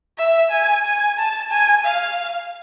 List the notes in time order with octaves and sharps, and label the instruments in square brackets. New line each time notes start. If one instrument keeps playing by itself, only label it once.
[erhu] E5
G#5
G#5
A5
G#5
F5